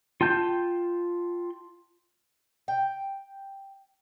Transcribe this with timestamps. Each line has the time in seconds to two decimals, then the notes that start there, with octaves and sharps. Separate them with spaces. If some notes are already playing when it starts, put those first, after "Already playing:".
0.21 F4 G5 A5 G6
2.68 G5